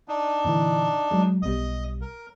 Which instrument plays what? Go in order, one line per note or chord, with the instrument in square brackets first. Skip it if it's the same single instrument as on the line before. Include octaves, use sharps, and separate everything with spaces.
[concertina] D4 D#4
[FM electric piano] A#2 D3 E3
F#3 G#3
[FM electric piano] B1 B2 G3 [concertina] D#5 D#6
[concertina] A#4